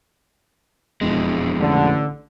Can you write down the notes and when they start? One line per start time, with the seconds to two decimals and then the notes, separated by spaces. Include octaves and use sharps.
1.01 E1 F2 G#3
1.60 A1 D3